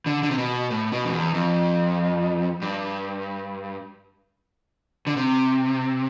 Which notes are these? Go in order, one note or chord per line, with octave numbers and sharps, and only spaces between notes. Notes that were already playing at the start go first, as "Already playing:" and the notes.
D3
D3
C3
B2
A2
B2
F2
E2
F2
G2
D3
C3